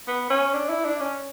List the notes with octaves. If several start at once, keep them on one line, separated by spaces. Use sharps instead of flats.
B3
C#4
D4
E4
D4
C#4